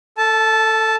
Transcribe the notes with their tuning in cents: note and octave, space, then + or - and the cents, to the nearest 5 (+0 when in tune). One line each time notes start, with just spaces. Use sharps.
A4 +15 A5 -10